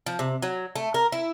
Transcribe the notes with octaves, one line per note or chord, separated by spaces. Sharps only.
F3
C3
F#3
A3
A#4
E4